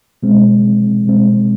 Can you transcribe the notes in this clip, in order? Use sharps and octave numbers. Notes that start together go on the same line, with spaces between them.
B2 G#3 C4
B2 G#3 C4